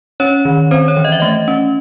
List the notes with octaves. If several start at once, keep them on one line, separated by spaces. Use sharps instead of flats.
C#4 C#5
D#3
C4 C5
C#5
E3
D#5
E5
A3 D#5
C#4